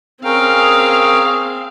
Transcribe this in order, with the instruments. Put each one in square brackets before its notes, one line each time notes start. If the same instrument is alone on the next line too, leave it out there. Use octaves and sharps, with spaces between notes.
[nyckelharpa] C4 [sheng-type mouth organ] C#4 A#4 G5 [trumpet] G#4 [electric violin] F5